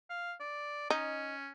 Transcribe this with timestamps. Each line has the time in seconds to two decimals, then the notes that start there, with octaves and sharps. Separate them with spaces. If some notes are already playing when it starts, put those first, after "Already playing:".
0.10 F5
0.40 D5
0.90 C#4 D#4